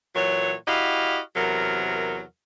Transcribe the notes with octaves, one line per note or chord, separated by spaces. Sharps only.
A#2 E3 F#3 C#5
E4 F#4 G4 D#5 F5
E2 C3 F#3 A#4